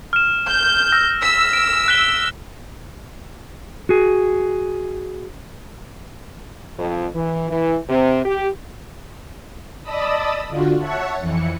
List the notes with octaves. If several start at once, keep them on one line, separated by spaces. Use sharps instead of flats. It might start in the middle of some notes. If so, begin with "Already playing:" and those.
F6 E7
G6
E6 F6 A#6
E6 B6
D7
F#6 B6 G7
F#4 G#4
F2
E3
E3
C3
G4
D5 D#5 A5 B5 D#6 E6
D3 F4 F#4
C#5 E5 F#5 A5 C#6
F2 E3 C#7